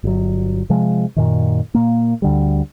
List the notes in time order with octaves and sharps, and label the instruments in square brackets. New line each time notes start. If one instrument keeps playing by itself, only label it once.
[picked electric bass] G1 F#3
C3 F3 G#3
F#2 A#2 D#3
A#2 A#3
D2 D3 G3